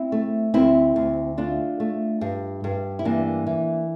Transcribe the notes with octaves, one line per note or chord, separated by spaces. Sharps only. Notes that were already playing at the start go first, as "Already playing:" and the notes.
Already playing: C4 E4
A3
D2 C4 E4
D2
A3 D4 F4
A3
G2
G2
E4
E3 A#3 D4
E3